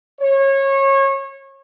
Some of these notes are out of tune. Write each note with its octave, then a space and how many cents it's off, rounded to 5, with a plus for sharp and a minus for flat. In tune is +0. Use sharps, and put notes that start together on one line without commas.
C#5 -25